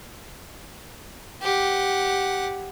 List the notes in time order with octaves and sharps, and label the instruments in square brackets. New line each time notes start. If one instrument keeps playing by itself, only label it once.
[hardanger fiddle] G4 F#5